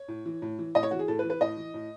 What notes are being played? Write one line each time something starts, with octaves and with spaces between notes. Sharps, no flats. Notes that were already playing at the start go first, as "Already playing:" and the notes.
Already playing: C#5
A2
E3
A2
E3
A2 D#5
C#5
E3 F#4
G#4
A2 A4
B4
E3
B4
A2 D#5
E3
A2